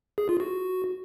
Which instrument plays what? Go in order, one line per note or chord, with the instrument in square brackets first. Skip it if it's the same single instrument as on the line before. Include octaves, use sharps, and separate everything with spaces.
[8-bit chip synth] G#4
F4
F#4